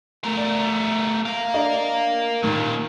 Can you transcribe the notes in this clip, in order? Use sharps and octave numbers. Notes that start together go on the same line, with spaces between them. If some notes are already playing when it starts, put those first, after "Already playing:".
A3 A#4
D5
A#4 F5
D4 D#5 A#5
D#2 A#2 D#3